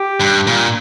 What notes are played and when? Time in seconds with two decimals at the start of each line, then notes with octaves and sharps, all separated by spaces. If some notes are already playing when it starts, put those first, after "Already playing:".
Already playing: G4
0.20 G2
0.47 A#2